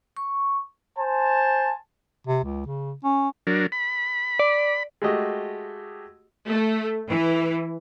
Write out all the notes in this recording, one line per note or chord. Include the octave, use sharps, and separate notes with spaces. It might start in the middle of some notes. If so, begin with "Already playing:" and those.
C#6
C5 G#5 A5
C3
C#2
C#3
C#4
F#3 D4 A#4
B5
D5
G#3 A3 F#4 G4 D#5
A3
E3